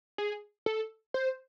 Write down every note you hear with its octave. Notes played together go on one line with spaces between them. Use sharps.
G#4
A4
C5